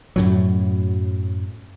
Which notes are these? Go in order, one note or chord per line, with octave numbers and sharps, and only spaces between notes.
F#2 A2 F#3